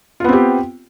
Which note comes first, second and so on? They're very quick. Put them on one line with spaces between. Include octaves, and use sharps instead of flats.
F4 B3 C4 G4